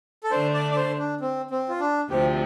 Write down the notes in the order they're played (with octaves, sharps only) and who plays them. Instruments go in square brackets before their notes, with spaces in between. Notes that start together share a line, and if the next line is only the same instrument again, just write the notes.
[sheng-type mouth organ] A4
[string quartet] D3 A3 D4 [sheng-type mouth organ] C5
[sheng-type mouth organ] D5
D5
C5
D4
C4
C4
F4
D4
[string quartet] D2 C3 F3 C4 [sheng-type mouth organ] G4